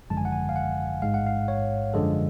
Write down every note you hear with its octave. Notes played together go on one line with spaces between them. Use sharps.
G#1 F#2 D3 F3 G#3 A5
G#5
F#5
G#5
F5
F#5
A1 G#2 G#3 F5
F#5
F5
C#5
F#2 D3 F3 G#3 A4